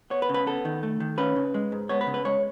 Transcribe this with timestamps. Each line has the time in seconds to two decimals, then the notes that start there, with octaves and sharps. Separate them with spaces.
0.10 B3 C#5
0.22 B4
0.29 C#3
0.34 B4
0.47 B3 A4
0.65 D#3
0.83 A3
1.00 D#3
1.18 C#4 B4
1.36 C#3
1.54 G#3
1.72 G#2
1.89 B3 C#5
2.01 B4
2.07 C#3
2.14 B4
2.25 G#3 C#5